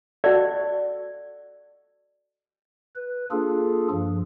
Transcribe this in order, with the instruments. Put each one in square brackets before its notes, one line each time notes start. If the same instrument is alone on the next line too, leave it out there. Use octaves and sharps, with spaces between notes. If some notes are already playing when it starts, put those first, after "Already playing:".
[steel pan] F#4 A4 [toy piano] D5 D#5
[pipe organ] B4
A#3 D4 F4 G#4 A4
G2 F3